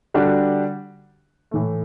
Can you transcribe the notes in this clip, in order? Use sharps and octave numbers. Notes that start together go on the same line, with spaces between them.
D3 G3 D4 F#4
A2 E3 A3